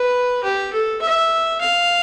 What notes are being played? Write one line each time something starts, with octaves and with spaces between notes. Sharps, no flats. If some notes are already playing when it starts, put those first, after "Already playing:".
Already playing: B4
G4
A4
E5
F5